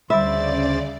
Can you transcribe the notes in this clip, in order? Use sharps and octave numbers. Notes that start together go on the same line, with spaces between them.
D2 C#3 G3 C5 D5 E5 B5 A6